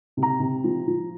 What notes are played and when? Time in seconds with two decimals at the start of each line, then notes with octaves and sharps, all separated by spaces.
0.17 C3
0.23 A#5
0.40 C3
0.64 F3
0.87 F3